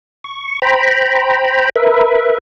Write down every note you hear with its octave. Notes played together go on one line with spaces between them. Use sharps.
C#6
C5 G5 A#5 B5
A#4 B4 E5